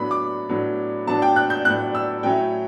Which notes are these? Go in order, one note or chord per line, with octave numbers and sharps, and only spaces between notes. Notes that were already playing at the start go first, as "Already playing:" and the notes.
Already playing: A2 F#3 B3 D4 B5
D6
A2 F#3 B3 D4
A2 F#3 B3 D4 A5
G5
F#6
G6
A2 F#3 B3 D4 F#6
E6
A2 F#3 A3 C#4 E4 G5